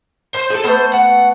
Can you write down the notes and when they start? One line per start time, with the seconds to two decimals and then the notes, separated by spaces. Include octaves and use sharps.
0.35 C5 C6
0.50 G#4 A4
0.64 A3 B3 C5
0.94 F#5